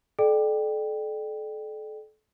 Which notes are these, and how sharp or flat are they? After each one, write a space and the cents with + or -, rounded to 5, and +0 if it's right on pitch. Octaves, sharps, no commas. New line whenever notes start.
A4 -35 D5 +30 G5 +0